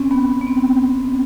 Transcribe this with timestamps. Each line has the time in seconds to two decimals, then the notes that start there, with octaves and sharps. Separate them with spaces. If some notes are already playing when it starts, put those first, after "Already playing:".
Already playing: C4 C#4
0.11 B3
0.41 B3
0.47 C4